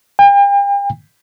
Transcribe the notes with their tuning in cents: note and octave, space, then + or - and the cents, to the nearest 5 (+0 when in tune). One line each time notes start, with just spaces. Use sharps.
G5 +40